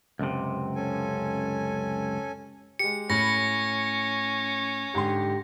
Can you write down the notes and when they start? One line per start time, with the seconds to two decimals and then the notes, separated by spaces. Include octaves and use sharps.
0.19 C#2 F#2 C3
0.75 C#4 A4 G#5
2.79 G#3 G4 C#7
3.10 A2 C#4 B5 A#6 C#7
4.95 G#2 D3 G4 C6